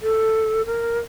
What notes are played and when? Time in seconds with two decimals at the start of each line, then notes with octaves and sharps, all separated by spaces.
0.02 A4
0.66 A#4